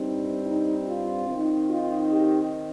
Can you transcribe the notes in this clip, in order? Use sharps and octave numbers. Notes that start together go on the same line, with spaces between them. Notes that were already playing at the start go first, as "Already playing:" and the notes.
Already playing: G2 G3 C4 D#4
D#4
F4
D#3 C4 D#4
F4
G4